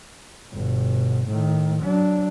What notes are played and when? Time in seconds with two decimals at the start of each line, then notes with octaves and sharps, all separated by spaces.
0.52 G1 B2
1.28 A2 D#3
1.82 F#3 D4